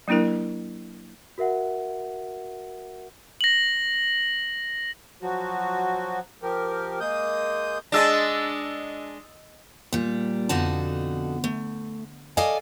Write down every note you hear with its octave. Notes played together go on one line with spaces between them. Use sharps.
F#3 A#3 D4 E4 A#4
F#4 A#4 E5 F#5
A#6 F#7
F3 F#3 F#4
F3 G4 A#4
G#3 A#3 D#6 G6
G#3 D4 D#5 E6 A6
A#2 G3
F2 B2 D3 D#4 F#4 A5
A3
A4 A#4 D5 D#5 F5 G#5